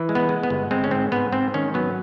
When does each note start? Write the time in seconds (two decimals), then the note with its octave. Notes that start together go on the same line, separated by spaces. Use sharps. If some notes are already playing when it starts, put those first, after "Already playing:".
Already playing: E3
0.09 G#3
0.15 B3
0.29 G#3
0.43 B3
0.50 G1
0.71 G#3 C4
0.84 C#4
0.91 G#2 C4
1.12 G#2 B3
1.32 G#2 C4
1.54 D#3 C#4
1.74 F#3 B3